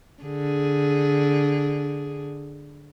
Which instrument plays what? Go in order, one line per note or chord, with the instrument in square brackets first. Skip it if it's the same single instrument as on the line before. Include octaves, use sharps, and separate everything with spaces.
[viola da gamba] D3 G#4